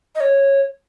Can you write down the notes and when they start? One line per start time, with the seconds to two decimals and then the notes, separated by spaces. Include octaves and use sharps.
0.15 D#5
0.20 C#5